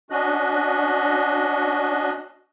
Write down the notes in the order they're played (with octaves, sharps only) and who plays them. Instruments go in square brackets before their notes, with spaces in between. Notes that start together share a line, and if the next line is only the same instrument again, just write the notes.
[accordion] C#4 D4 F#4 D#5 F#6